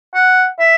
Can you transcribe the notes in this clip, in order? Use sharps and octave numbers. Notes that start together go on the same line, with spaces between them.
F#5
E5